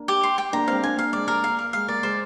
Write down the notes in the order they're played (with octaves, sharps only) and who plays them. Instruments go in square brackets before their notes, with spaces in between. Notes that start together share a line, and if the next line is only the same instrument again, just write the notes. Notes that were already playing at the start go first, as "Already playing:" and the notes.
Already playing: [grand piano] A#3 D4
[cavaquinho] G4
C6
G5
[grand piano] A#3 D4 [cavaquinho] A#5
[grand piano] G#3 C4 [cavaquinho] F5
[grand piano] A#3 D4 [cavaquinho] G#5
[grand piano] A#3 [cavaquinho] F5
[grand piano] G#3 [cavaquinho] D5
[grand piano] A#3 [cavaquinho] A#4
[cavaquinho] F5
A#4
[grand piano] G#3 [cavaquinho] F5
[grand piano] A#3 [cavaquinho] D5
[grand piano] G#3 [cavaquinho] C5